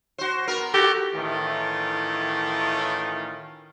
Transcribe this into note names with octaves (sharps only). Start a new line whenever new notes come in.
F#4 C5
B3 A#4
F#4 G4 A4
A2 D#3 E3 A3 C#4 F4